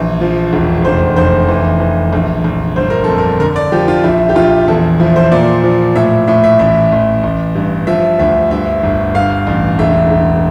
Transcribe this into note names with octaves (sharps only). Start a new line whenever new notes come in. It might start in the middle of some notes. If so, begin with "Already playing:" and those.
Already playing: A#1 E3
F3
E1
F1 C5
F1 C5
E3
E3
A#1
A#1
G1 C5
A#4
F2 A4
A#4
D3 A#4
D5
F3 G4
F4
A#1 E4
G4
A#1 F4
E2 A4
F3 E4
C5
A#2 D5
F3
A2 E5
A2 E5
E5
A1 E5
A1
A1
G2
F3 E5
D2 E5
G2 E5
G1
G2 F5
A1
E1 E5
E1